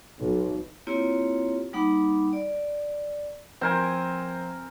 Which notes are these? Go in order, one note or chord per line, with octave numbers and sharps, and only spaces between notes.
B1
A#3 C4 E4 F4 G4 C#5
G3 A#3 D#4 F#5 B5 D6
D5
F3 C4 A#4 C5 G#5